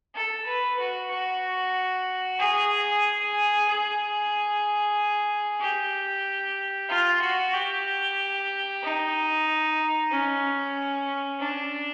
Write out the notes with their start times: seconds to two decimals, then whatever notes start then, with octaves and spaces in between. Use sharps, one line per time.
0.15 A4
0.46 B4
0.79 F#4
1.10 F#4
2.39 G#4
3.68 G#4
5.61 G4
6.89 F4
7.21 F#4
7.54 G4
8.83 D#4
10.11 C#4
11.40 D4